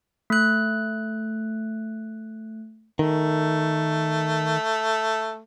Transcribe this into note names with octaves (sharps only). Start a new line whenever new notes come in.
A3 F#6
D#3 A3